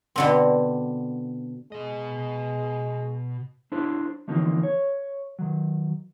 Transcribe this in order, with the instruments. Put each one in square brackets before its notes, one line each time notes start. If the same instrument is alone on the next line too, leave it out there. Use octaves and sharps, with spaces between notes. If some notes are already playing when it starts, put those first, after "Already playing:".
[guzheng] B2 D3 C4
[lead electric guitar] B2 D#5 [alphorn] G#3
[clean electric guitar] D4 E4 A4 C5
D3 E3 F3 A#3 C4 D#4
C#5
D#3 F#3